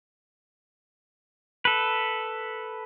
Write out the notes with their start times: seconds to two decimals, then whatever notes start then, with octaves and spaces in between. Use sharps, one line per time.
1.65 A4 B4